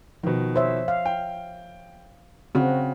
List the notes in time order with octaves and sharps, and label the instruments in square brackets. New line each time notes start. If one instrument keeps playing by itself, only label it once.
[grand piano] B2 D#3 [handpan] F3
[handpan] C5 C#5 E5
F5
[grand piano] G5
[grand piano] C#3 [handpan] C4 F#4